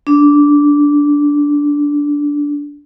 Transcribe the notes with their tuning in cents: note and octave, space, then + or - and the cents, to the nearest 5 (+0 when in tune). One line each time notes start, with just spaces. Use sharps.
D4 -10